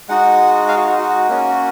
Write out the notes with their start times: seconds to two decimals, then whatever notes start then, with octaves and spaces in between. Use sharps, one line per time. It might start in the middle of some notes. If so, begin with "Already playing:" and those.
0.09 G#3 D#4 F#4 F#5
0.68 F5
0.78 F#4
0.88 F#4
0.99 F#4
1.28 A#3 C#4 F#4